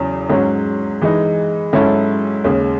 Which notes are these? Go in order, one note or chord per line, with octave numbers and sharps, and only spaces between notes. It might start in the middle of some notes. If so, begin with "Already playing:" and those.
Already playing: E2 C#3 F#3
G#2 F#3 C#4
E3 G#3 D#4
G#2 F#3 C#4 E4 A4
D#2 C#3 G#3